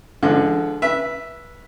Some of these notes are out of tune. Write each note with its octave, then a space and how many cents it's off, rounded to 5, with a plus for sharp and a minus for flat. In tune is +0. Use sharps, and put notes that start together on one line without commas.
D3 +0 F3 -45 G#3 +5
B4 -25 E5 +0